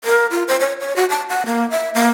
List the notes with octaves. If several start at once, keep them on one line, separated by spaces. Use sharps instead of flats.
A#4
F4
C5
C#5
C#5
F#4
A5
F#5
A#3
E5
A#3